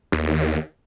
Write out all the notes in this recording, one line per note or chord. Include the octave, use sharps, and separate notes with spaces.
D#2